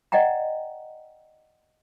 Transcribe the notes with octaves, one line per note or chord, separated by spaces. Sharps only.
D5 D#5 F#5 G5 A#5